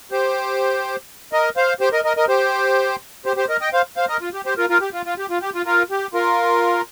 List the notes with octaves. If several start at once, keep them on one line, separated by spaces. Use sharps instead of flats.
G4 C5
A#4 D#5
C5 F5
G4 C5
A#4 D#5
A#4 D#5
A#4 D#5
G4 C5
G4 C5
G4 C5
A#4 D#5
D#5 G5
C5 F5
C5 F5
A#4 D#5
F4
G4
G4 C5
F4 A#4
F4 A#4
G4
F4
F4
G4
F4
G4
F4
F4 A#4
G4
F4 A#4